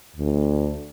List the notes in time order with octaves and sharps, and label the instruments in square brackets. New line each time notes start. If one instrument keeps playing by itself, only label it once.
[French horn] D2